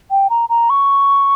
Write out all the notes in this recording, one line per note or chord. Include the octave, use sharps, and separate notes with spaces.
G5
A#5
A#5
C#6